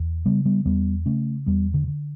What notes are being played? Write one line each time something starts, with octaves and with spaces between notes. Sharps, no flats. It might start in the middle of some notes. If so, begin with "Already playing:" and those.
Already playing: E2
C#3 G3 B3
G3 B3
E2 G3 B3
C#3 A3 C#4
E2 G3 B3
D3
D3